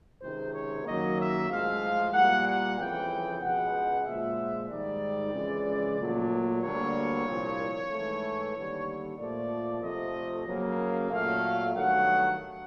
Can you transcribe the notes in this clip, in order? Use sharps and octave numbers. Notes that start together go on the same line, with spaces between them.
C#2 C3 D#3 G#3 C5
C#5
F#2 D#3 F#3 A#3 D#5
E5
A2 F3 G#3 F5
A#2 G3 A#3 F#5
F#5
F2 C#3 E3 G5
C#2 B2 G#3 F#5
A#2 F3 G#3 E5
G#2 D#3 G3 D5
F2 C#3 E3 G#3
A#2 F#3 A3
D2 D3 G3 A#3 C#5
C2 A#2 F3
G#2 E3 A3
D#2 D3 G3
A#2 F3 A3 D5
F2 C3 F3 A3 D#5
F#2 C#3 F#3 A#3
A#2 F#3 A3 F5
G2 D#3 F#3 A3 F#5